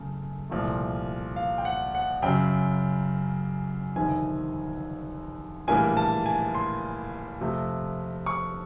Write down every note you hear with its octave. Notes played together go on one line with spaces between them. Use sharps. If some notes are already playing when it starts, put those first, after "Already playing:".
Already playing: F#2 C#3 A3
C2 A#2 F3 A3
F5
G5
F#5
F#5
F#2 C#3 F#3 G5
G1 F2 C3 D#3 G#5
A#1 A2 E3 G3 A#3 G#5
A5
G#5
C6
F2 C3 F3 A3
C#6